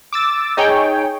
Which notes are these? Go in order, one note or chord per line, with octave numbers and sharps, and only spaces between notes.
D6 E6 A6
D#4 G#4 C#5 G5